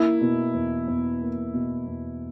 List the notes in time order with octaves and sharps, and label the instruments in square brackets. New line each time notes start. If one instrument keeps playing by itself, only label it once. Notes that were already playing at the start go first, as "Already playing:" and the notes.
Already playing: [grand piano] A#3 [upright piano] E4
[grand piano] B2
E2
E2
A#3
B2
E2